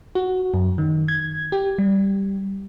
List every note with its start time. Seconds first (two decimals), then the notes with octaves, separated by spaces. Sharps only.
0.15 F#4
0.54 F#2
0.78 D#3
1.08 G#6
1.52 G4
1.78 G3